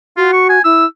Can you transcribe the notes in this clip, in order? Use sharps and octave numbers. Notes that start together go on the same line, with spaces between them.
F4 F#4
C#6
G#5
E4 E6